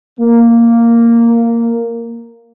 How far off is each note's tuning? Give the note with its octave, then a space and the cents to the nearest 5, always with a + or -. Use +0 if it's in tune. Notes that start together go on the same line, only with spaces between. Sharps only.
A#3 -5